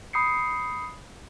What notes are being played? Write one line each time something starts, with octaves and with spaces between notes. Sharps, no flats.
B5 D#6 G6 C7 C#7